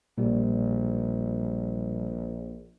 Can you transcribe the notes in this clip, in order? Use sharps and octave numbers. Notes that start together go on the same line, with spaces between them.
A#1 A#2 G3